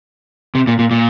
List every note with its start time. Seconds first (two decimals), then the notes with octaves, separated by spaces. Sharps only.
0.55 C3
0.67 A#2
0.79 A#2
0.91 A#2